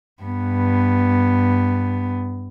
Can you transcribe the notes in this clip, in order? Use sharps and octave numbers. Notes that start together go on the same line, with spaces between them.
G2 B3